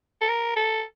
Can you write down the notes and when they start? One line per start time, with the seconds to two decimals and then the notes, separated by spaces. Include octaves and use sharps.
0.21 A4
0.28 A#4
0.56 A4